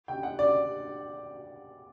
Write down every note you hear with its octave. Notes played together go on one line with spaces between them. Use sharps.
G5
F#5
D5